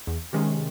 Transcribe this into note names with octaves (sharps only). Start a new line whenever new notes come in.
E2
C3 D#3 G#3 C#4